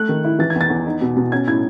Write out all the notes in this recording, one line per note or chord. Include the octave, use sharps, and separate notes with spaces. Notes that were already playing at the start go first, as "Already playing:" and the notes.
Already playing: A3 F#6
D#3
E4
E3 A6
G#6
E2
A6
E2
D#4
B2
B2
C#4 G#6
A2 G#6